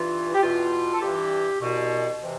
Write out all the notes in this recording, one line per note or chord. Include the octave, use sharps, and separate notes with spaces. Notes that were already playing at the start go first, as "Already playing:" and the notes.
Already playing: G2 E3 F4
G4
E2 B2 F4
A4
G2 E3 G4
C2 B2
C3 E3